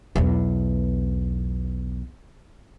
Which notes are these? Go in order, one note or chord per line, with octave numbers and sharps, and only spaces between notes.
B1 E2